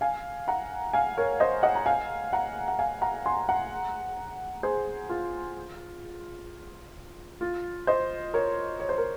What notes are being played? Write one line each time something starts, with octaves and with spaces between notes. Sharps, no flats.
F5 G#5
F#5 A#5
F5 G#5
A#4 C#5
C5 D#5
D#5 F#5
A#5
F5 G#5
F#5 A#5
F#5
F5 G#5
F#5 A#5
G#5 C6
F#5 A#5
G#4 C5
F4
F4
C5 D#5
A#4 C#5
C#5
C5
A#4